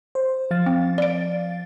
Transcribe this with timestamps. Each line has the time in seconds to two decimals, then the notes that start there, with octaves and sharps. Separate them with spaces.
0.15 C5
0.51 F3 F5 A6
0.66 C4
0.98 D5 D7